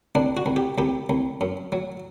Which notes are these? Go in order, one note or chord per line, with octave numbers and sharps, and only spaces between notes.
C2 D4
F#4
C2
G4
C2 G4
C2
F#2
F#3